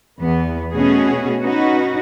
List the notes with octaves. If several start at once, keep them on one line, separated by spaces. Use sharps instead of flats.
E2 B3
B2 A3 C#4 F#4 G#4
C#4 D#4 F#4 B4